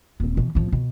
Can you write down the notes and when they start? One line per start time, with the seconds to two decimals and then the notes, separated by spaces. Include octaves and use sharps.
0.20 D#1 C4
0.37 B2 E3
0.55 A1 F3
0.72 B2